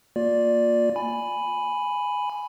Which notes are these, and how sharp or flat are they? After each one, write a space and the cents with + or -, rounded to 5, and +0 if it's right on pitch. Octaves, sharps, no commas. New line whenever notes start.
A#3 +0 F4 +30 D5 +0
G#5 +0 B5 +5